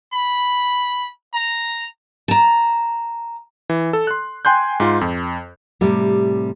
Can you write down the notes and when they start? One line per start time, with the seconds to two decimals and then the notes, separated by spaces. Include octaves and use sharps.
0.13 B5
1.34 A#5
2.28 A5 A#5
3.70 E3
3.93 A4
4.07 C6 F#6
4.45 G5 G#5 C6 F#6 G6
4.80 G#2 F4 C6
5.01 F2
5.81 A2 C3 G3